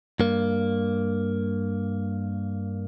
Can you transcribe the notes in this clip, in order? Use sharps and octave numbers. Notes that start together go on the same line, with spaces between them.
G2 A#3